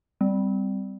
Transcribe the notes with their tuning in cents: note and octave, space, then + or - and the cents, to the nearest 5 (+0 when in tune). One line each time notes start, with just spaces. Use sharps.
G3 +0 C4 -20